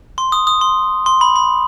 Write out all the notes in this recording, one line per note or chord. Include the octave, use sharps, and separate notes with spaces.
C6
D#6
D#6
C6
C6
B5
B5